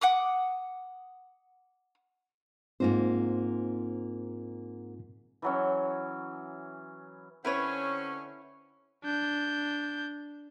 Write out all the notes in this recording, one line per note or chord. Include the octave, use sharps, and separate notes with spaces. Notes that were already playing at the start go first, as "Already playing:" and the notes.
F#5 D6 D#6
G#2 A#3 C4 D#4 F4 C5
E3 F#3 C#4
D3 C4 C#4 E4 B4 C#5
D4 G6